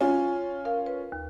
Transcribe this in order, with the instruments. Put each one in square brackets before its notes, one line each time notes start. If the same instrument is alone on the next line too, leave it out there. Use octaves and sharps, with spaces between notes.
[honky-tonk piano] C#4 F4 [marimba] G#5
[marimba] A#4 F5
B4
D#2